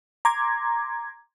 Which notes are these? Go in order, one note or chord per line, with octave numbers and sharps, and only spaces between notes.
A#5 C6 D6 G#6